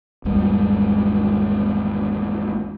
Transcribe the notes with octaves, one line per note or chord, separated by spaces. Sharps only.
G#1 E2 G3 G#3